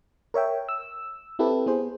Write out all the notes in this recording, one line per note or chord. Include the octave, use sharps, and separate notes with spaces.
A#4 C#5 E5 G5
E6
C4 E4 G4 A4 B4
B3 G#4 C5